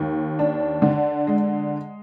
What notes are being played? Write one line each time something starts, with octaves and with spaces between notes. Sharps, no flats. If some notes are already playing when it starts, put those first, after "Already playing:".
Already playing: D#2
D4
D3
G#3